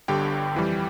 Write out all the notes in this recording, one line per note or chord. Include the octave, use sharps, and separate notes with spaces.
G1 G2 D3 G4 G5
F2 E3 G3